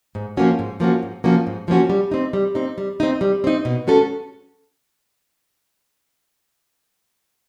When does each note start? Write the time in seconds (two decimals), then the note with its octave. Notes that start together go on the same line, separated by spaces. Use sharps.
0.15 G#2
0.37 F3 A#3 C#4 F#4
0.59 G#2
0.80 F3 A#3 C#4 F#4
1.02 G#2
1.24 F3 A#3 C#4 F#4
1.47 G#2
1.68 F3 A#3 C#4 F#4
1.90 G3
2.11 C4 D#4
2.33 G3
2.55 C4 D#4
2.78 G3
3.00 C4 D#4
3.21 G3
3.44 C4 D#4
3.65 B2
3.87 G#3 C#4 F#4 A4